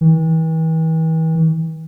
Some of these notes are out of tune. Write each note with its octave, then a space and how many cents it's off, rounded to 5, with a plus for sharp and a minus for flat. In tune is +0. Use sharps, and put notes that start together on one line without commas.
E3 -40